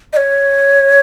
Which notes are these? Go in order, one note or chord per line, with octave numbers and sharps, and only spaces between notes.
D#5
C#5